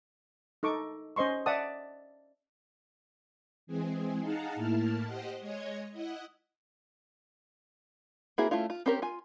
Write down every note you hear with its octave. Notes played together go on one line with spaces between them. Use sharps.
D#4 A4 C#6 D6
C#4 C5 D#5 C6 C#6
D5 E5 F#5 A5 D#6
E3 G#3 C4 G#4
D#4 G#4 F5 F#5 A5 A#5
A2 A#3 E4 A5 F6
G4 C5 D#5 F#5
G#3 C#5 D#5 G#6
E4 D#5 F#5
A#3 C4 E4 F#4 G#4
A3 C#4 E4 F4
F4
C4 C#4 G4 A#4
F4 G#5